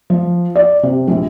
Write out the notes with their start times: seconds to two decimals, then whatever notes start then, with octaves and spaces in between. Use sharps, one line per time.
0.10 F3
0.56 D5
0.83 C3
1.08 A#1